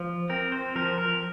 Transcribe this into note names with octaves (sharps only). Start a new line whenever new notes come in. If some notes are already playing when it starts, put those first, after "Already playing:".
Already playing: F3
C4 A#4
C5
F3 A#4
A#4